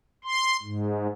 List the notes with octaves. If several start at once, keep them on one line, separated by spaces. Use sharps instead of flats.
C6
G#2